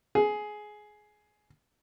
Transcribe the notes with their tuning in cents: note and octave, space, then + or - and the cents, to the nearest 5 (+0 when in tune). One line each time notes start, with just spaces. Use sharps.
G#4 +15